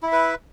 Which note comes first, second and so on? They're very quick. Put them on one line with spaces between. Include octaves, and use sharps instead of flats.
E4 E5 B4